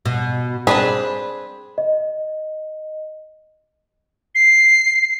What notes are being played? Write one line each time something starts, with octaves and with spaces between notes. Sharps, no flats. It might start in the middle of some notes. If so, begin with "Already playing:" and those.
B2
C4 D4 G#4 B4
D#5
C7